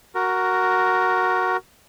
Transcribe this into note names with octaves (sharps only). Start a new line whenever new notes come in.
F#4 A#4